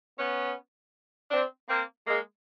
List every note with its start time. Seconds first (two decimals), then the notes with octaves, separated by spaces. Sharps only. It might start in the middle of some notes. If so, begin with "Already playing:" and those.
0.18 B3 C#4
1.31 C4 D4
1.69 A#3 C4
2.07 G#3 A#3